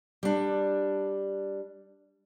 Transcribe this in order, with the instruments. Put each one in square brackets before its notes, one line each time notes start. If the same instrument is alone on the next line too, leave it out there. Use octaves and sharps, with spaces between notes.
[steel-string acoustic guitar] G3 D4